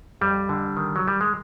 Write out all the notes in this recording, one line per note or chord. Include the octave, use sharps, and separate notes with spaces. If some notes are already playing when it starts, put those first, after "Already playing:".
F2 G3
D3
D#3
F#3
D#3 G3
G#3